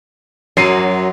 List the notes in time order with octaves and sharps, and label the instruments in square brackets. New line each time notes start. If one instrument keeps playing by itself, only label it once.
[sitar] F#2 [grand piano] F#3 C7 D#7